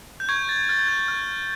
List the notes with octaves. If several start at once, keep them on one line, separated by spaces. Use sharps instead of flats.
G6
C#6 G#6
A6
F6 A6
G#6
G6
F6